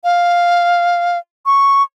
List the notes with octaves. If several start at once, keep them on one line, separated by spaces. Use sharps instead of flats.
F5
C#6